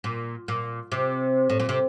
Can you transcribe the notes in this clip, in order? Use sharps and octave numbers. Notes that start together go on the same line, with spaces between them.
A#2
A#2
C3
A2
A#2
C3